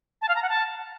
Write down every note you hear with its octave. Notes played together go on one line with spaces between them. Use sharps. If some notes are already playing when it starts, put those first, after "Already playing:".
A5
F5
A#5
F#5
A5